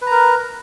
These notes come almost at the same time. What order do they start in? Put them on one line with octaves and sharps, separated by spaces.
B4 A#5 A#4